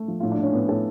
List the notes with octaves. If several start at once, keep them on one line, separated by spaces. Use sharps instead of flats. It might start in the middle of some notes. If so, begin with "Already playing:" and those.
Already playing: A3
F3
A2 F4
D4
A2 C#4
A2 B3
A2 A4